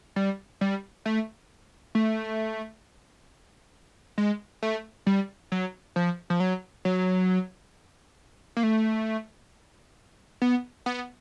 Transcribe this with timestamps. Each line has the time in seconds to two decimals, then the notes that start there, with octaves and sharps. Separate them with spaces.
0.16 G3
0.61 G3
1.06 A3
1.95 A3
4.18 G#3
4.62 A3
5.07 G3
5.52 F#3
5.96 F3
6.30 F3
6.40 F#3
6.85 F#3
8.57 A#3
8.63 A3
10.42 B3
10.86 B3